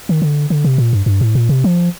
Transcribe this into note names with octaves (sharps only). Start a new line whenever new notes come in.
D#3
D3
D3
C3
A#2
G2
G2
A2
A#2
C3
F3